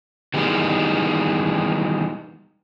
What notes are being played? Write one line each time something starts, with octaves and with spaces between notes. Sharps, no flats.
D#3 E3 G3 G#3 B3 D#4